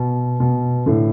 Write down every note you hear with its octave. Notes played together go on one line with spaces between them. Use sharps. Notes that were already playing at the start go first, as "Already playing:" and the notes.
Already playing: B2
B2
A2 D3